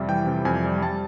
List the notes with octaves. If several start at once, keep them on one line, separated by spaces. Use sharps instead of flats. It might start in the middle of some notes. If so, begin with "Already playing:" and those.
Already playing: F2 C3 G3 E5
E3 G5
C3
F2 G#5
G3
G3 A5